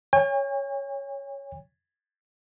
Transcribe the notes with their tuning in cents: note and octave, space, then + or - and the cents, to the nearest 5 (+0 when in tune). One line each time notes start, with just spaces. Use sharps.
C#5 +0 G#5 -45